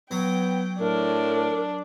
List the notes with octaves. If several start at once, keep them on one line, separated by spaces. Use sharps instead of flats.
F#3 B3 G5
A2 D4 A#4